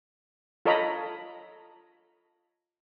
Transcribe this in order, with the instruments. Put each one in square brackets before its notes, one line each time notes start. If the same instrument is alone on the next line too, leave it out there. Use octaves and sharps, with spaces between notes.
[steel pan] F4 A4 C#5 D#5 A#5 B5